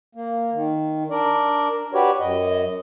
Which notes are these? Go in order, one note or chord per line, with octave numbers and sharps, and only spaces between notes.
A#3
D#3
D4 A#4 D5
F#4 G4 B4 C#5 D5
F#2 D#5